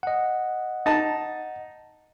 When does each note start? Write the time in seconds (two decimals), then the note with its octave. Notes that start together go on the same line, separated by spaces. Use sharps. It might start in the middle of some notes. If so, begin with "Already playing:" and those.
0.03 D#5 F#5
0.86 D#4 A5